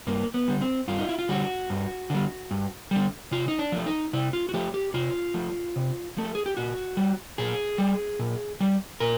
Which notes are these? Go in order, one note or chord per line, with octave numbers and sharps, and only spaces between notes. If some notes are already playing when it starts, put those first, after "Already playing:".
G2 A#3
B3
D3 G3
C4
G2 F4
D#4
E4
F4
D3 G3 F#4
G2
D3 G3
G2
D3 G3
C3 F4
D#4
D4
F3 A3
D#4
C3 E4
F4
F#4
F3 A3 G4
G4
C3 F4
F3 A3
C3
F3 A3
A4
G#4
G4
A#2 F#4
G3
A#2 G#4
G3
A#2
G3
A#2 A#4